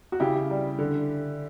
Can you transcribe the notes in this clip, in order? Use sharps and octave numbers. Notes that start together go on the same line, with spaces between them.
F#4
C#3 E4 G4
G3
D3